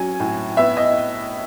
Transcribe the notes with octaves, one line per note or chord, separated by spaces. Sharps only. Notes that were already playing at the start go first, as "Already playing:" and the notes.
Already playing: F#3 C#4 G#5
A2
B3 E5
D#5